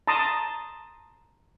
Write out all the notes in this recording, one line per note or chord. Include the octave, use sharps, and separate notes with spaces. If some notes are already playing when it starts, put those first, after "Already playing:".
A5 A#5 C6 D#6